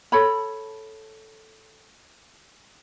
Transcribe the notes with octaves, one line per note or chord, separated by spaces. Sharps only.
A4 C#5 B5